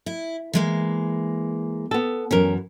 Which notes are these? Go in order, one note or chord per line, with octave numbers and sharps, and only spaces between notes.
E4
E3 G#3 A#3
B3 A4
F#2 E3 C#4 A#4